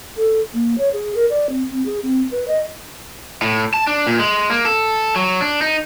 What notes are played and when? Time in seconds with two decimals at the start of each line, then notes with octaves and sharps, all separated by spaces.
0.17 A4
0.54 A#3
0.78 C#5
0.93 G#4
1.15 A#4
1.30 D5
1.49 C4
1.70 C4
1.86 G#4
2.03 C4
2.31 B4
2.48 D#5
3.42 A2
3.74 A5
3.87 D4
4.07 A#2
4.20 G#3
4.50 A#3
4.65 A4
5.16 F#3
5.41 D4
5.61 D#4